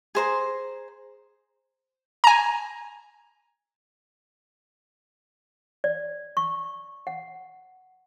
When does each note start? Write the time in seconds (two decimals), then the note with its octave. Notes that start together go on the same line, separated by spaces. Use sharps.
0.15 G#4 C5 A#5
2.24 G#5 A#5
5.84 D5
6.37 C#6
7.07 F#5